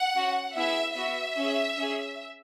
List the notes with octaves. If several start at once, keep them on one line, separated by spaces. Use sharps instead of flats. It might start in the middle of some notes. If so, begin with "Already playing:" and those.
Already playing: F#5
C#4 F#4
B3 E4 G#4 E5
B3 F#4 E5
C#4 G#4
C#4 G#4